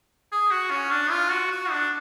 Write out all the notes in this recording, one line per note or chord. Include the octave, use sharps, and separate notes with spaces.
G#4
F#4
C#4
D4
F4
F#4
F#4
D4